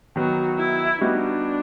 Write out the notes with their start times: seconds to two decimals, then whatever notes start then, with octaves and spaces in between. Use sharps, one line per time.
0.16 D#3 F#3 B3 F#4
0.59 E4
1.01 G3 B3 D4 D#4 F#4